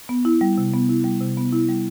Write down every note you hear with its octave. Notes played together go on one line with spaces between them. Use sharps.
B3
E4
G3
C3
B3
E4
G3
C3
B3
E4
G3